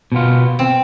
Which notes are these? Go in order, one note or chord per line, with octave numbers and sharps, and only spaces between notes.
B2 B3 F4
C4